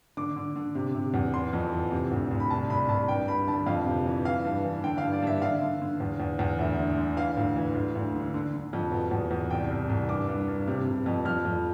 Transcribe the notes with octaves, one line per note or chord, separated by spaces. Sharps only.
D3 D6
D3
D3
C3
C3
E2
E3 C6
F2
E3
C3
D2
D2
B5
C2 A5
C2 B5
C2 A5
G2 G5
G2 B5
D3 A5
F2 F5
C3
E3
E3 F5
G2
E3
D3 G5
F5
G2
D5
G2 E5
D3 F5
D3
D3
E2
E2
E2
D2 E5
D3
D3
E3 F5
D2
E3
D2
D2
D3
D3
D3
F2
B2
E2
E2
C2 G5
C2
C2
G2 D6
G2
G2
C3
C3
F2
F2 F6
F2